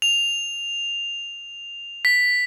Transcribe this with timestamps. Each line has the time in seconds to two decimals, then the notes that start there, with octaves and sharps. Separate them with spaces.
0.02 F7
2.05 B6